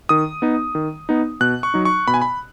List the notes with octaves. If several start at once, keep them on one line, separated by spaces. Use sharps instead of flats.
D#3 D#6
B3 D#4
D#3
B3 D#4
B2 F#6
C#6
F#3 D#4
C#6
B2 B5
G#5
B5